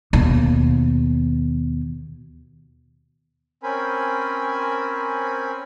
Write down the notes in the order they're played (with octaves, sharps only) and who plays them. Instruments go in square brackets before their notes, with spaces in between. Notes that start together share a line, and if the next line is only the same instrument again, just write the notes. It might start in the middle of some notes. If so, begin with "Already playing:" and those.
[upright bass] D#2 B2
[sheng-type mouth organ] C4 C#4 A#4 C5 G#5 B5